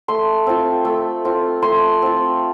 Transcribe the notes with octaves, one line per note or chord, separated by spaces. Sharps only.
A3 C6
C4 F4
A3
C4 F4
A3 C6
C4 F4